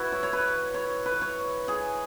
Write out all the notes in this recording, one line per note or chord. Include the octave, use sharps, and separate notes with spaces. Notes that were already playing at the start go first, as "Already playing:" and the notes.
Already playing: E4 F#4 B4
C#5
C#5
B4
C#5
B4
C#5
G#4